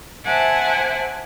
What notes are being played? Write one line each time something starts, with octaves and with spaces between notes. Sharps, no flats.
C5 E5 F#5 G#5 A5 D6